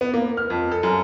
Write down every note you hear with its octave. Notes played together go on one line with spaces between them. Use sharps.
B3
A#3
F6
F2
A4
F#2